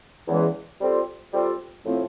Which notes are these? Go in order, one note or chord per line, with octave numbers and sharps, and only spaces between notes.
E2 C#3 E3 G#3
G3 C4 F4 A4
G3 C4 F4 A4
A2 F3 A3 C4